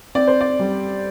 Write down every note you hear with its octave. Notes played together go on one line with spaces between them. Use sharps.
C4 D5
C5
D5
G3